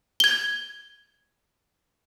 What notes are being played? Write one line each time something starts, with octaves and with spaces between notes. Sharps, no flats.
G#6 G7